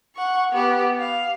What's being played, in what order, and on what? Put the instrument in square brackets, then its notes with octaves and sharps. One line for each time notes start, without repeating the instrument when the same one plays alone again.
[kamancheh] F#5 C#6
B3 G4
F5